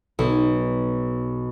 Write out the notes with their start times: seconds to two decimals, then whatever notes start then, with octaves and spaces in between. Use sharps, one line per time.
0.19 B1